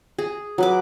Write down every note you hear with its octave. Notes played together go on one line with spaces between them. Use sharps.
G#4
F#3 B4 D6